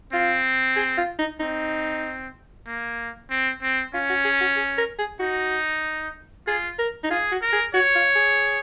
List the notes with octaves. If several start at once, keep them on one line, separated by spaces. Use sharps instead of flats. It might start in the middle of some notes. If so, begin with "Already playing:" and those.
C4 F4
G#4
F4
D#4
C4 D#4
A#3
C4
C4
C#4 F4
F#4
G#4
F#4
G#4
A#4
G#4
D#4 F#4
F4 G#4
A#4
D#4
F4 G#4
F#4
A#4
G#4
F#4 C#5
F4
G#4